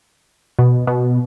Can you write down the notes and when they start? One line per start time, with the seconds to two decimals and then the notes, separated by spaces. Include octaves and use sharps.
0.59 B2
0.87 B2